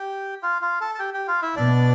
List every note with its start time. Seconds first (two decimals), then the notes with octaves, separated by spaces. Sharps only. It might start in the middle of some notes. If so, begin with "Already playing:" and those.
Already playing: G4 G5
0.43 F4 F5
0.62 F4 F5
0.80 A4 A5
0.95 A5
0.99 G4 G5
1.14 G4 G5
1.28 F4 F5
1.42 E4 E5
1.56 B2 B3 D4 D5